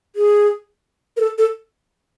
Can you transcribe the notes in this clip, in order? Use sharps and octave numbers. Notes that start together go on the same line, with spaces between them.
G#4
A#4
A4
A4